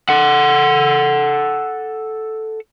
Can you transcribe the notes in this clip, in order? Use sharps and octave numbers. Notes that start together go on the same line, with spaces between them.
A4 F#5